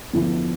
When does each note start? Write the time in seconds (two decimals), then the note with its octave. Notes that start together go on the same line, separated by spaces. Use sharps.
0.13 E2 D3 F3 A3 E4